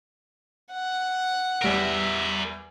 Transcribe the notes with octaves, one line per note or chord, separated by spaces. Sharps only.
F#5
E2 G3 A#4 E5 D7